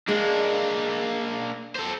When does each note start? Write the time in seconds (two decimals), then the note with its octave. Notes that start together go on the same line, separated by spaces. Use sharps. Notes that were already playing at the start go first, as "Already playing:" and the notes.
0.09 G#3 A#3 D4
1.75 A4 C5